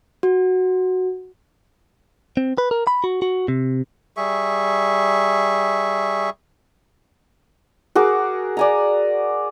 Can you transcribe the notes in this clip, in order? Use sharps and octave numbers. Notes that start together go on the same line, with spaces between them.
F#4
C4
B4
A#4
B5
F#4
F#4
C3
G3 G#4 E5 C#6
F#4 G#4 A#4 D6
D5 G#5 A#5